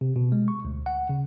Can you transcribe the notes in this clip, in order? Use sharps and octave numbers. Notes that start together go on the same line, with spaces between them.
C3
B2
G#3
C#6
D2
F#5
C#3